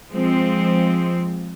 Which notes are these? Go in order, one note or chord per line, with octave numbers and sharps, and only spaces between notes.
F3 G#3 C4